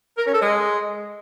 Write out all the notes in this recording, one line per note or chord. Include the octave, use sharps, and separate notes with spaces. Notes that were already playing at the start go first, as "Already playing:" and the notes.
A#4
C#4
A4
G#3